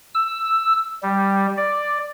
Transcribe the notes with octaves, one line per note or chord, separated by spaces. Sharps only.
E6
G3
D5